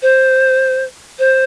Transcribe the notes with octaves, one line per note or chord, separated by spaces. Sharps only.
C5
C5